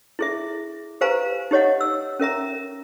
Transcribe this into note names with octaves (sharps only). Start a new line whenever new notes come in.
E4 G#4 E5
G4 B4 C5 F5 G#5 A#5
D#4 G4 C#5 D#5 F#5
E6
C#4 A#4 E5 A#5